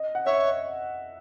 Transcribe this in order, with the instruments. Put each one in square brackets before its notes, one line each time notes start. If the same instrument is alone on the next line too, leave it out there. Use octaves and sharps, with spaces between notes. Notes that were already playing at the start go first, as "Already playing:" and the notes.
Already playing: [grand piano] D#5
F#5
[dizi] C#5 [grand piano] E5